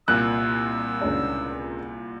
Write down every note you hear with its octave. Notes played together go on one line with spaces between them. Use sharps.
C2 A#2 E6 F#6
C#2 C#4 D4